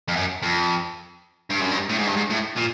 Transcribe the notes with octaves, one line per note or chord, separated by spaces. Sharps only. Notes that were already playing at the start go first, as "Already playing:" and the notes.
F2
F#2
F2
G2
F#2
G2
A2
G#2
G2
G#2
A2
A#2